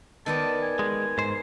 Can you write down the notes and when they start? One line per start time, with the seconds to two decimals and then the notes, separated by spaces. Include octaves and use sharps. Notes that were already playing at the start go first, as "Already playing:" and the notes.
0.26 D#3 B3 D5 A5
0.62 G#5
0.79 G#3
1.18 G#2 C5